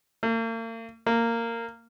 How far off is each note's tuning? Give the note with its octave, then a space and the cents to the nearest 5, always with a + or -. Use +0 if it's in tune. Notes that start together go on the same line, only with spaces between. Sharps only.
A#3 -45
A#3 -15